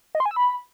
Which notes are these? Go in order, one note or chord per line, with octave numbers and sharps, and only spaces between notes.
D#5
C6
G#5
E6
B5